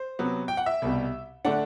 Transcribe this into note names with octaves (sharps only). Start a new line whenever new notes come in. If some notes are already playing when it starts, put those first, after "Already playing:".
Already playing: C5
C3 F#3 B3
G5
F#5
E5
C2 B2 G3
D3 A3 D4 F#5